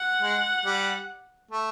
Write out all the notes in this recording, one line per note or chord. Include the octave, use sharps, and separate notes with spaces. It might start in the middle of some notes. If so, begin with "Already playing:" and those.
Already playing: F#5
G#3
G3
A3